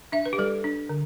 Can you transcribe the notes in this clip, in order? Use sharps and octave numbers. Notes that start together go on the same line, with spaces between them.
D4 E5
B4
G4
G3 A4
D4
D3